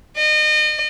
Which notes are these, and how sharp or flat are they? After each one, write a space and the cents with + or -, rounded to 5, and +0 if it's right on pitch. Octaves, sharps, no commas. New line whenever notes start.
D#5 -35